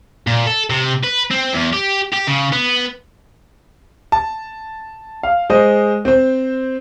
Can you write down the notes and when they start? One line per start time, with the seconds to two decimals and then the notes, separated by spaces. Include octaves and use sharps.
0.27 A#2
0.46 A4
0.70 C3
1.04 B4
1.31 C4
1.53 E2
1.73 G4
2.13 G4
2.27 C#3
2.52 B3
4.12 A5
5.23 F5
5.50 G#3 C5 D#5
6.05 C4 C5